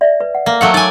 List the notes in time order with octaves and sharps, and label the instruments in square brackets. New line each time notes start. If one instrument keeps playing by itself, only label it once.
[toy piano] D5 E5
B4
F#5
[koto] A#3
[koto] F#3 A3 F#5 [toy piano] F5
[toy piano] D#4 [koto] D5 G#5